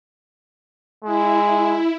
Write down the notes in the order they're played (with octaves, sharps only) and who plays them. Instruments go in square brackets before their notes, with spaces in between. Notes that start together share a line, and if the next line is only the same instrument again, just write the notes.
[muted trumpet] G#3 [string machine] E4